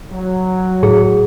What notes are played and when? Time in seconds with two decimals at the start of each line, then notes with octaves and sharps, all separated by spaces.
0.12 F#3
0.83 A2 G#4